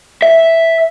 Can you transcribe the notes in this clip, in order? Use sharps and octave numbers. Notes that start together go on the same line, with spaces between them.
E5